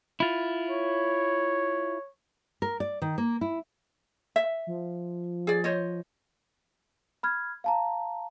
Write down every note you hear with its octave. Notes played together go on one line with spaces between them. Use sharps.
E4 F4
C#5
A#4
D5
D#3
A#3
E4
E5
F3
G#4 D5
C5 C#5 D#5
B5 F6 G#6
F5 A5 A#5